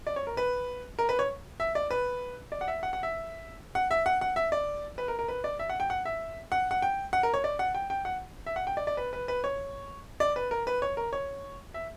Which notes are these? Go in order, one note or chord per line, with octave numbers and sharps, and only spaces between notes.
D5
C#5
A#4
B4
A#4
B4
C#5
E5
D5
B4
D5
F#5
E5
F#5
F#5
E5
F#5
E5
F#5
F#5
E5
D5
B4
A#4
A#4
B4
D5
E5
F#5
G5
F#5
E5
F#5
F#5
G5
F#5
A#4
C#5
D5
F#5
G5
G5
F#5
E5
F#5
G5
D5
D5
B4
B4
B4
C#5
D5
B4
A#4
B4
C#5
A#4
C#5
E5